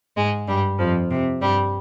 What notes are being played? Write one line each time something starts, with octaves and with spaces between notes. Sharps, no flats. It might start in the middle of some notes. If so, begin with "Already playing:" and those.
G#2 G#3
G2 G3
F2 F3
C3
G2 G3